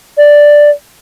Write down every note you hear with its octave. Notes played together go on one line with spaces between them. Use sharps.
D5